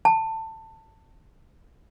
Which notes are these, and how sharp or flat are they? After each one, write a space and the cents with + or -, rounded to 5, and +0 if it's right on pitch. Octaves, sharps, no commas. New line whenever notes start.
A5 +20